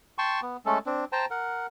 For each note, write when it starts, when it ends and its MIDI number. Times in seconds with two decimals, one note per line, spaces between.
0.18 0.41 79
0.18 0.41 81
0.18 0.41 84
0.18 0.41 85
0.42 0.57 59
0.66 0.78 56
0.66 0.78 57
0.66 0.78 61
0.66 0.78 69
0.86 1.05 60
0.86 1.05 62
1.12 1.26 72
1.12 1.26 79
1.12 1.26 81
1.12 1.26 82
1.31 1.67 70
1.31 1.67 78